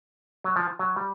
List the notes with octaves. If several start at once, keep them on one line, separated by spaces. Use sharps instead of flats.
F#3
F3
F#3
G3